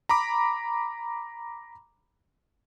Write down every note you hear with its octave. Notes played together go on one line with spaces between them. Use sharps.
A#5 B5 D6